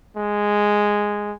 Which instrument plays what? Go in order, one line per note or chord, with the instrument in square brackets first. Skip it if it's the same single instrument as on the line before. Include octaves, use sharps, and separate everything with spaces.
[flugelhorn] G#3